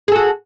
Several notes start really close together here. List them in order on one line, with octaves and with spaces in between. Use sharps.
G#4 A4 F#4